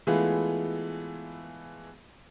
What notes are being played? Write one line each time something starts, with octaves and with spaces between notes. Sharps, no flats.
E3 G#3 A3 B3 F4 G#4